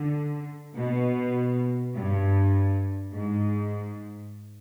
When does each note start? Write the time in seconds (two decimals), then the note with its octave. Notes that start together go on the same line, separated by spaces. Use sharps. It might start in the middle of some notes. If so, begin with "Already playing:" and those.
Already playing: D3
0.76 B2
1.94 G2
3.13 G#2